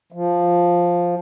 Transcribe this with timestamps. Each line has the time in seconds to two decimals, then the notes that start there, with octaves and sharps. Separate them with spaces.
0.12 F3